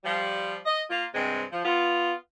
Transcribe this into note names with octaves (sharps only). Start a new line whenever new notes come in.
F3 G3
D#5
A#3 F4
G2 C3 G#3 C4
F3
B3 F4